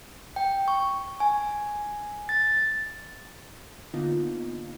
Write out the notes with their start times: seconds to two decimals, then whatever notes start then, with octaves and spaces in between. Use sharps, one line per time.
0.36 G5
0.68 C#6
1.20 G#5
2.29 A6
3.94 D3 A#3 B3 D#4 F4